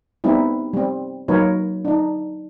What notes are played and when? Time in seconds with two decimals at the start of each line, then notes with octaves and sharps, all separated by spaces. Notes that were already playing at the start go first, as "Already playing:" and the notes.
0.24 G3 B3 C4 D#4 E4
0.73 G3 C4
1.28 F#3 A#3 D#4 A#4 B4 C#5
1.85 D4 D#4